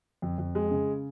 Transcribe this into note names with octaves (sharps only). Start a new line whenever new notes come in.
F2
F2
G#3
C#3